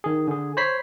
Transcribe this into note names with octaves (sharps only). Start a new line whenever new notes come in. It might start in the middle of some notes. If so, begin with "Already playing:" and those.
D#3 G#4
D3 G#4
C5 C#5 B5 B6 C7